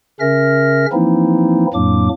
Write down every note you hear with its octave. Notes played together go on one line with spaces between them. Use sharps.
C#3 C#4 A#4 E5 F6 A#6
E3 F3 A#3 C4 D#4 E4
F2 A2 F#3 A#3 D4 D6